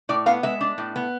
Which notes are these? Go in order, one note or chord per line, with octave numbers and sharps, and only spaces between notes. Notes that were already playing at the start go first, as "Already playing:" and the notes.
A2 D5
B3 F5
G#3 E5
D4
A2
B3